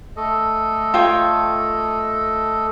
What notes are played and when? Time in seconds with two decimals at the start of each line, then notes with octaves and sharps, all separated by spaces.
0.16 A3 A4 D#5
0.94 F4 C#5 G5